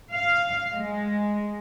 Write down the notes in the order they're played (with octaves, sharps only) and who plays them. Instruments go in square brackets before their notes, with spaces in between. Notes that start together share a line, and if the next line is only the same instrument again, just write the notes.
[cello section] F5
G#3